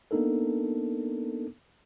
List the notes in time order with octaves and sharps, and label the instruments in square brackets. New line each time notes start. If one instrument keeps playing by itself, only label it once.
[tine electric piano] A#3 B3 D4 D#4 A4 A#4